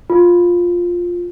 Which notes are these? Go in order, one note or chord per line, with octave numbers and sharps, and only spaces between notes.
F4